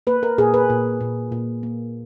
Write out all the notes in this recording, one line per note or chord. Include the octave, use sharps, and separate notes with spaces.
A#3 B4
A#4
A#2 G#4
B4
A#2
A#2
A#2
A#3